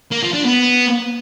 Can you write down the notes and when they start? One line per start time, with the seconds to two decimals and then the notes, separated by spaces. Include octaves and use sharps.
0.12 A#3
0.23 F3
0.34 D4
0.45 B3